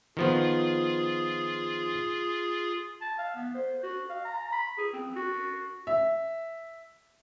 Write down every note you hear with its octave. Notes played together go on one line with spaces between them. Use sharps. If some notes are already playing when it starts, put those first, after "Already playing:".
D#3 F3 B3 F4 G#4
A5
F5
B3
C5
F#4
F5
A#5
B5
G#4
C4
F#4
E5